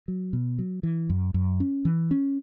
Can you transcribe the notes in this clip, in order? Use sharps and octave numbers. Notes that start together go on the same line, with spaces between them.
F#3
B2
F#3
E3
F#2
F#2
C#4
E3
C#4